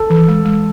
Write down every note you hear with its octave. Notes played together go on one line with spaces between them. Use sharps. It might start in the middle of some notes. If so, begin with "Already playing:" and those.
Already playing: A4
E3
G#3
G#3